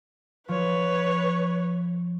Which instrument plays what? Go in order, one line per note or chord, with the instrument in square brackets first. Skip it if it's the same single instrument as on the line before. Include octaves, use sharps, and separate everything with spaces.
[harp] F3 [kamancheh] B4 C#5